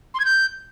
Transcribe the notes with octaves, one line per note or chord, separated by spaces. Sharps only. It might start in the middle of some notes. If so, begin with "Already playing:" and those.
C6
G#6
G6